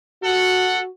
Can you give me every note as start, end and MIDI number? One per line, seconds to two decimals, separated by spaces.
0.23 0.87 66
0.23 0.80 69
0.23 0.80 78